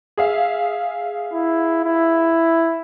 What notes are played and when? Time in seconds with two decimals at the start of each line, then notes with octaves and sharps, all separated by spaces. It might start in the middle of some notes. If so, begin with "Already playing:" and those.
0.17 G#4 E5 F5
1.32 E4
1.85 E4